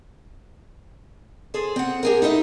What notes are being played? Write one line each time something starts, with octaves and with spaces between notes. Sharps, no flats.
G#4 A4 C5
C4 F#5
G4 G#4 A#4
D#4 E4 A4 D#5